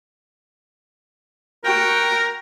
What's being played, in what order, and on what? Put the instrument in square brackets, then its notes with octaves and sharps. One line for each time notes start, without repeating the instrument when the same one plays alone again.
[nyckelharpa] F#4 G5 [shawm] A#4